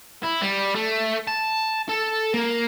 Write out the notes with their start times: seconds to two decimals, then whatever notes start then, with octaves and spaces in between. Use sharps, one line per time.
0.23 E4
0.41 G3
0.76 A3
1.28 A5
1.89 A4
2.34 A#3